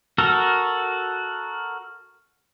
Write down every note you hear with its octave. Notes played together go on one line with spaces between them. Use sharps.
F#4 A4 A#4